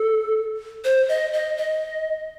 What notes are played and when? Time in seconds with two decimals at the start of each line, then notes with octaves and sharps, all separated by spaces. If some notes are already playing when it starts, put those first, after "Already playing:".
Already playing: A4
0.85 C5
1.09 D#5
1.33 D#5
1.57 D#5